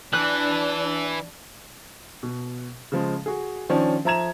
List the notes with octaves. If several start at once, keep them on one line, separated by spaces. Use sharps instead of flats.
E3 D4 F#6
B2
C#3 F3 G#3
F#4 G#4
D#3 F3 C#4 D4
F3 E5 A#5 G#6 E7